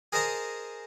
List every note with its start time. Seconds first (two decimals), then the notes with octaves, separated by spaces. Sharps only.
0.12 G#4 A#4 C5 D#5 A5 A#5